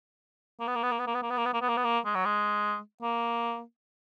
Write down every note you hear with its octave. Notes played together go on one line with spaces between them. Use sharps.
A#3
B3
A#3
B3
A#3
B3
A#3
B3
A#3
B3
A#3
B3
A#3
B3
A#3
B3
A#3
G#3
F#3
G#3
A#3